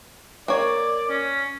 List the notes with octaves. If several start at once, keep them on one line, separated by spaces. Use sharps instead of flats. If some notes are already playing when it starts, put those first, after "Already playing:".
A#3 C#5 D5
C#4